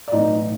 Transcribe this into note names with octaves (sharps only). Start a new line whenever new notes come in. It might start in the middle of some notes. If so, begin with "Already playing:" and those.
D5
B1 A2 E3 D#4 D#5